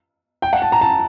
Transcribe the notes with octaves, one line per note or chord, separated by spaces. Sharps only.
G5
F#5
A5
A#5
A5